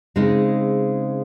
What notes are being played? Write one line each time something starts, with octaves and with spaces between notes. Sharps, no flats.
C#3 G#3 C4 D#4